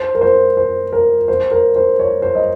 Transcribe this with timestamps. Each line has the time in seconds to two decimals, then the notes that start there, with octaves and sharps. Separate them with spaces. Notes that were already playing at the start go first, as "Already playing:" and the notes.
Already playing: C5
0.15 A#4
0.21 C5
0.57 C5
0.93 A#4
1.28 C5
1.52 A#4
1.76 C5
1.99 C#5
2.22 C5
2.35 D#5